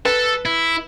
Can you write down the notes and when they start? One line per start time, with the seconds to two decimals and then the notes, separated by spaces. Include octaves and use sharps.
0.05 A4 B4
0.45 E4